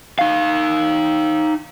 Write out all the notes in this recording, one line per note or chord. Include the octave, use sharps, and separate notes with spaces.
D#4 F5